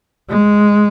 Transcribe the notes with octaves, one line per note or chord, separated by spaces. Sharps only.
G#3